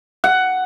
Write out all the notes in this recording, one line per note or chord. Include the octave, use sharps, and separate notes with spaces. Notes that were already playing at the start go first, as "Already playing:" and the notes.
F#5